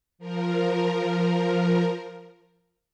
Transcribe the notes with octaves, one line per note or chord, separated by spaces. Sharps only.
F3 A#4